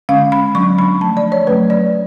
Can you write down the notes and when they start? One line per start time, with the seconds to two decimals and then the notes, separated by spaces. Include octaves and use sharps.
0.09 D3 G#3 C#4 F5
0.32 B5
0.55 F#3 B3 D4 C#6
0.78 B5
1.01 F3 A3 D4 A5
1.17 D5
1.32 C#5
1.47 F#3 A3 C#4 B4
1.70 D5